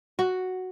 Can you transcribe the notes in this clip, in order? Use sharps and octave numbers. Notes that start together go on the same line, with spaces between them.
F#4